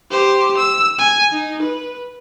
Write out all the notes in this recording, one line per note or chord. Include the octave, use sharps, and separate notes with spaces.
G4 C5
E6
G#5
D#4
B4